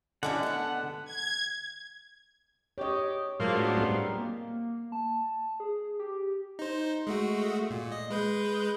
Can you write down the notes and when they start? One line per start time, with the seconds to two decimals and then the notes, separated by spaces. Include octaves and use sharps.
0.23 D3 G3 C#4 E4 D#5 F#5
0.43 B3 A5 F#6
1.05 G#6
2.78 G4 C#5 D#5
3.40 A2 F#3 G#3 A#3 F4 C5
3.54 A#3 B3 D4
3.77 G3 C4 A#4
4.18 A#3
4.92 A5
5.60 G#4
5.99 G4
6.59 D#4 C5
7.07 G#3 A3 F#4
7.70 A#2
7.92 D#5
8.11 G#3 B4 G6